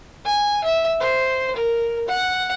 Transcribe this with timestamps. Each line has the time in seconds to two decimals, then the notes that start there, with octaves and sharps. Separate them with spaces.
0.25 G#5
0.64 E5
1.00 C5
1.56 A#4
2.08 F#5